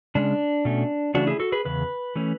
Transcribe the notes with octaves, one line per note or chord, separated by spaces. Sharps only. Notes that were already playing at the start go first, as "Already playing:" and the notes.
C#3 G#3 C#4 D4
B2 A3 C#4
C#3 E3 A3 C#4 D4 F#4
E4 G#4
F#4 A4
G#4 B4
E2 C#3 B4
E3 A3 C#4